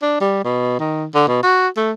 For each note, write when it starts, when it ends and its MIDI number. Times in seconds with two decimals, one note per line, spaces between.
0.02 0.20 62
0.21 0.44 55
0.44 0.76 47
0.79 1.05 51
1.15 1.26 50
1.28 1.39 47
1.43 1.68 66
1.77 1.92 57